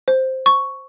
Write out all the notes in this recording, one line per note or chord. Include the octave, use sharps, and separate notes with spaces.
C5
C#6